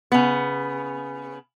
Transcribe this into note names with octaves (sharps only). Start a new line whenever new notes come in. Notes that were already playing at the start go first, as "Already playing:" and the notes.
C#3 B3